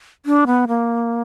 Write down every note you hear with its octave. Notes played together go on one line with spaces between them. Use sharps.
D4
B3
A#3